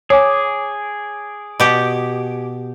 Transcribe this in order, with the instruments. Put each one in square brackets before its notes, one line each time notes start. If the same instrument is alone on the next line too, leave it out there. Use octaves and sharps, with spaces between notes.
[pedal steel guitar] G#4 D6 [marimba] C#5 G#5
[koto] B2 G4